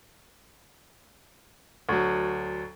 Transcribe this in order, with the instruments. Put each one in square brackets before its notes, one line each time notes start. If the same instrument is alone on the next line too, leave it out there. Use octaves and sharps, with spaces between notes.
[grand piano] D2 F#3